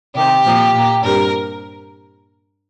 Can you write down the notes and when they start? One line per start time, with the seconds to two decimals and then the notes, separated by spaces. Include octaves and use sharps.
0.15 C3 D#3 C4 G4
0.44 A#2 F3 A#3
0.74 A#2 A#3
1.03 G2 G3 C4 A#4